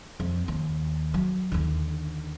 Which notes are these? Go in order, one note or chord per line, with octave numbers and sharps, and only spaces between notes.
F2
D#2
F#3
D#2 D3